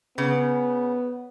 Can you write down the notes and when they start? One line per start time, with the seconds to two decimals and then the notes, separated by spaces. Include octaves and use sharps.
0.18 C#3 B3